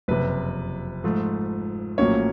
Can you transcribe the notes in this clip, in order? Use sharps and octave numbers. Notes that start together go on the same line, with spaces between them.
F#1 F2 C3 B4
G#2 F3 A3
A#1 A2 F#3 A#3 C#4 C#5